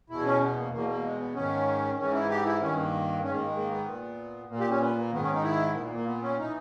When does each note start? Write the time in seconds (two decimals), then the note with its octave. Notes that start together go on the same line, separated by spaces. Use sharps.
0.10 E2 B2 E4
0.24 C#4
0.41 B3
0.56 A#3
0.72 E2 B2 A#3
0.88 A#3
1.04 G#3
1.19 B3
1.35 G#2 D#3 C#4
1.98 G#2 E3 C#4
2.13 E4
2.29 G4
2.45 E4
2.61 G2 D#3 C#4
2.76 A#3
3.23 G#2 D#3 C#4
3.33 A#3
3.45 G#3
3.55 A#3
3.71 B3
3.86 A#2
4.49 A#2 A#3
4.60 G4
4.70 C#4
4.80 B3
4.97 A#3
5.12 G#2 D#3 B3
5.22 C#4
5.33 D#4
5.43 E4
5.74 A#2 B3
5.85 A#3
5.96 A#3
6.06 B3
6.22 C#4
6.38 E3 D#4